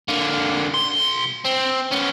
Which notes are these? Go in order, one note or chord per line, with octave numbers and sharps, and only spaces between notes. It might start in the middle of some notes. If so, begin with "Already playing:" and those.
D3 A#3
B1 C6
C4
B3 C#4